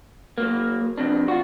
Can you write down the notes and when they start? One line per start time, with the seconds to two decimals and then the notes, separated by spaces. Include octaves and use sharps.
0.38 F#3 A#3
0.98 F2 C3 D4
1.28 F4 F#4